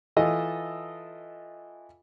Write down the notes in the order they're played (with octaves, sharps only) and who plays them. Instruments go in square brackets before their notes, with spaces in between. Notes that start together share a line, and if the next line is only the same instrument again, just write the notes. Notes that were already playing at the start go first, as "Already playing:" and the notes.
[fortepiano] E3 F4 A4 D#5 D#6